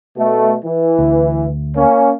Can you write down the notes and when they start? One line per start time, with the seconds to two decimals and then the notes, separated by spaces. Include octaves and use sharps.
0.16 B2 A3
0.64 E3
0.99 D2
1.76 A#3 C#4